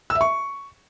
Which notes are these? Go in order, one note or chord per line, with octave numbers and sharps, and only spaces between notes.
E6
E5
C#6